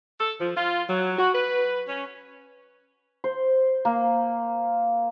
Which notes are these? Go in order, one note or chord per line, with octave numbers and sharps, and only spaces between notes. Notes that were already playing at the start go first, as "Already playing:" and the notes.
A4
F3
F4
F#3
F#4
B4
C#4
C5
A#3